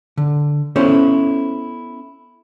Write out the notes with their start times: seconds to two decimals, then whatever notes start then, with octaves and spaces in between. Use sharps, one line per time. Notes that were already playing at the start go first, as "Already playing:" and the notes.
0.17 D3
0.76 B3 C#4 E4 A4 C5 C#5